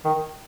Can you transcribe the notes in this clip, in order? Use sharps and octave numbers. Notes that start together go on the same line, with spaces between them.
D#3